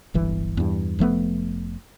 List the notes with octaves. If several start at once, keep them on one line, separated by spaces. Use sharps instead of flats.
D1 G1 E3
E2 G2
F1 F3 A3 B3